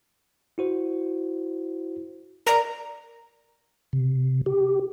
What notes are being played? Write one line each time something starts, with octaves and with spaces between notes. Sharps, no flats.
E4 F#4 C5
A#4 D5 A#5
C3
G4